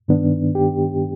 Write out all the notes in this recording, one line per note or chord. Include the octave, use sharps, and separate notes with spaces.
G2 D#3 B3 D4
G4